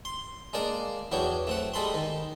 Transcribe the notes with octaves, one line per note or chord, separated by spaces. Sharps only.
C6
G#3 A#3 D4 D5 F5
E2 F#3 D4 C#5 G5
A3 C4 F#5
G3 G#3 A4 B5 C6
D#3